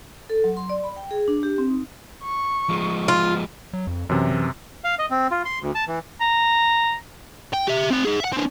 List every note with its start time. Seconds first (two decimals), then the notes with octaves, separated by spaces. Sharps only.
0.30 A4
0.44 F#3
0.57 C6
0.69 D5
0.84 B5
0.96 G5
1.11 G#4
1.28 D4
1.43 G4
1.58 C4
1.70 D#4
2.23 C#6
2.69 F3 G#3
3.08 F4
3.73 F#3
3.87 F2
4.09 F#2 C3 E3
4.31 E3
4.84 F5
4.99 D#5
5.10 C4
5.31 F4
5.45 C6
5.62 D2
5.75 A5
5.87 E3
6.21 A#5
7.54 G5
7.68 G4 E5
7.91 C4 F#5
8.05 D#4 G#4
8.20 E5 F#5
8.32 C4 D4